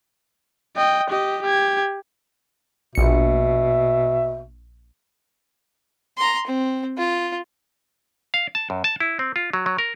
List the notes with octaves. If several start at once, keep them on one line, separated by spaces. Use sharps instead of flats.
D#5 G5
G4 D#5
G4 G#6
A#1 B2 E5 C#7
A#5 C6
C4
F4
F5
A5
F#2
A5
E4
C4
F4
F#3
F#3
A#4